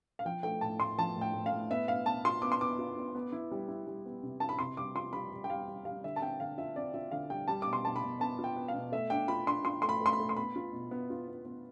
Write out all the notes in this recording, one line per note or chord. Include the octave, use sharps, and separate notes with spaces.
F5
F3 G5
A3 G5
A2 A5
A2 C6
F3 A5
A2
G5
A2
F5
A2
B3 E5
B3 F5
B3 A5
F4 C6
B3 D6
C6
B3 D6
F4
B3
B3
E4
G3
E4
G3
B3
C3
E4 A5
B5
C3 C6
G3 D6
F4 C6
G3 B5
G3
G5
G3 F5
G3
G3 F5
D3 E5
A5
C4 G5
D3 F5
F4 E5
C4 D5
F4 E5
D3 F5
G3 G5
G3 A5
B2 D6
C6
B2 A5
B5
B2
B3 A5
F4
G5
B3
F5
B2
A3 E5
D4 G5
F4 B5
D4 C6
F4 C6
A3 C6
B5
A3 C6
B5
A3
C6
B3 B5
F4
B2
B3
F4
B3
B3